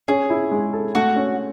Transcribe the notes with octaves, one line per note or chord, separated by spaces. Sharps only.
C#4 G#4
E4
G#3
A4
A3 F#4
C#4